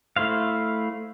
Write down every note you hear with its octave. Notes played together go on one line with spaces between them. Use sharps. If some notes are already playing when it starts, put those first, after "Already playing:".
A3 E4 C5 F5